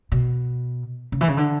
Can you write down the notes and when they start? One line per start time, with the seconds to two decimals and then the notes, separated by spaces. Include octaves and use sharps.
0.12 B2
1.12 C#3
1.21 E3
1.28 C#3
1.37 D3